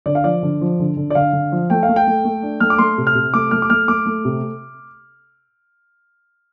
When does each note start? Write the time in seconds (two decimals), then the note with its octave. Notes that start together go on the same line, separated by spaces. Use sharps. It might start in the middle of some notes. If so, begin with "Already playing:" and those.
0.06 D3 D5
0.15 F5
0.24 F3 D5
0.43 D3
0.61 F3
0.79 D3
0.97 D3
1.10 D5
1.15 D3 F5
1.33 D3
1.52 F3
1.70 A3 G5
1.83 F5
1.89 A3
1.96 G5
2.07 A3
2.25 A3
2.42 D4
2.60 A3 F6
2.70 D6
2.78 A3 C6
2.98 C3
3.07 F6
3.15 C3
3.34 A3 D6
3.51 A3 F6
3.62 D6
3.70 A3 F6
3.88 A3 D6
4.06 A3
4.25 C3